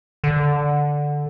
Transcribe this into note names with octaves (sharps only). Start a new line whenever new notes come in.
D3